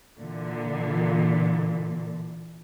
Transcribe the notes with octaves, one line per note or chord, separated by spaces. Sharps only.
A#2 D3 E3